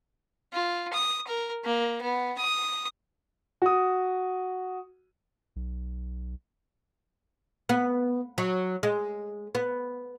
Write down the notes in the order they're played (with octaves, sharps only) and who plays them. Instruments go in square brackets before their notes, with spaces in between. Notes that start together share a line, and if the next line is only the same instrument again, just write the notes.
[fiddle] F4
D#6
A#4
A#3
B3
D#6
[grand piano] F#4 D#6
[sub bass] B1
[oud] B3
F#3
G#3
B3